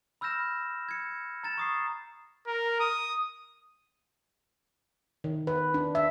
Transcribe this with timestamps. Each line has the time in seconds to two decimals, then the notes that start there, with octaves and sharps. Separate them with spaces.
0.21 B5 E6 F6 G6 A#6 E7
0.89 G#6 C#7
1.43 A#5 A6 E7
1.58 C#6 D#6 C7
2.47 A#4
2.80 D#6
5.24 D#3
5.47 B4
5.74 D4
5.95 E5